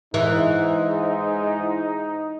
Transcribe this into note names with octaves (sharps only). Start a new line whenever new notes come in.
G#2 E3 D#4